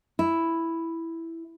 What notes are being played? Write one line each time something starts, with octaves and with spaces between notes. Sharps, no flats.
E4